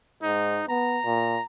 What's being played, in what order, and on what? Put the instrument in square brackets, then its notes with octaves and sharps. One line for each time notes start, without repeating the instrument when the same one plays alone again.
[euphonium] G#2 [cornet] D#4
[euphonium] B3 [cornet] A#5
[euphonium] A#2